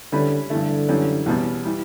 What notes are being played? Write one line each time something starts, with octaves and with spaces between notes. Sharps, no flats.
D3 G3 C#4 E4 B4
G2 D3 E3 A3
F#2 E3 G3 C#4
E2 B2 G3 C#4
E3 G3